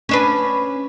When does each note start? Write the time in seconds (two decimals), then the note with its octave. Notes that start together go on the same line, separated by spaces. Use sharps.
0.09 C#4 D4 B4